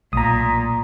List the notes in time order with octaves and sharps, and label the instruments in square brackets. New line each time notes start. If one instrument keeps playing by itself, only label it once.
[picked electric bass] B1 [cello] A#2 [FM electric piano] A#5 D#6